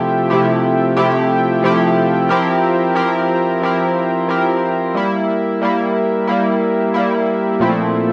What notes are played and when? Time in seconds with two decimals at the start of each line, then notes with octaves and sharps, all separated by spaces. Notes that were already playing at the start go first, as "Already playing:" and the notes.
Already playing: C3 F3 A3 E4 G4
0.30 C3 F3 A3 E4 G4
0.97 C3 F3 A3 E4 G4
1.62 C3 F3 A3 E4 G4
2.29 F3 C4 E4 G4 A#4
2.95 F3 C4 E4 G4 A#4
3.62 F3 C4 E4 G4 A#4
4.28 F3 C4 E4 G4 A#4
4.95 G3 A#3 E4
5.61 G3 A#3 E4
6.27 G3 A#3 E4
6.94 G3 A#3 E4
7.60 A#2 F3 A3 C4 E4